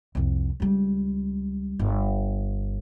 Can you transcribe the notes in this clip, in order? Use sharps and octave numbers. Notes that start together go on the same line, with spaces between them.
C2 F2
C#2 G3
G1